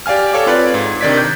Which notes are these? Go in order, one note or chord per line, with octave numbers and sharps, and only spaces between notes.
G4 D5 F5 G#5 F6
A4 C#5 D5 F5 D6
C4 F4 B4 C#5 D5
G#2
C3 D#3 D4 D5 G#6 B6
G6